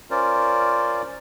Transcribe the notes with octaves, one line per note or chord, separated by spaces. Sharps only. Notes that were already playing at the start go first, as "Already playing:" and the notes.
C#4 F4 A#4 C5 D5